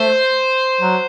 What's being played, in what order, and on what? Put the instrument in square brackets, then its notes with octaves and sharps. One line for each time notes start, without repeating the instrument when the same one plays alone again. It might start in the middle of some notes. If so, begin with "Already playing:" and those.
Already playing: [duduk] A3 [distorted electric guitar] C5
[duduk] F#3